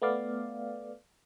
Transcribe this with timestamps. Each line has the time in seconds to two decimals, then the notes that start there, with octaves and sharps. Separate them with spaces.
0.02 A3 B3 D5 F5